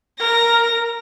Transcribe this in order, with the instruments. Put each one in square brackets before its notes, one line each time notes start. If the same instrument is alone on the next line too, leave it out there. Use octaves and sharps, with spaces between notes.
[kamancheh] A#4 [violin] A#6